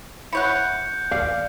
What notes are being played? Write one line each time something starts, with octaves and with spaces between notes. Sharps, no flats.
E4 C#5 F#5 F#6 G6 C#7
D#2 D5 F5